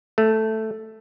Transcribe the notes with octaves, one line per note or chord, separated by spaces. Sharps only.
A3